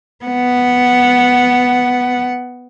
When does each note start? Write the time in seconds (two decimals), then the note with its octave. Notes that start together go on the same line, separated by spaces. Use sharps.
0.25 B3 F#5